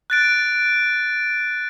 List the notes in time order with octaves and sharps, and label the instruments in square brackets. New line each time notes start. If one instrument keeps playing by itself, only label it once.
[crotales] F#6 A6 D7